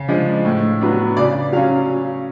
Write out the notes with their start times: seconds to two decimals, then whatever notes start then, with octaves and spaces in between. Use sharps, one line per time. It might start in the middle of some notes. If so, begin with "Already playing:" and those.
Already playing: C#3
0.08 F3 G#3 D4
0.45 A2
0.81 F#3 B3 D4
1.17 C#3 D5
1.53 F#3 F5
1.56 C#4